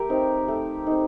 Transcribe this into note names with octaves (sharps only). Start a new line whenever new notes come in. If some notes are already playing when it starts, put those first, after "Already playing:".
Already playing: A3 G4 A#4
C4 D#4
A3
C4 D#4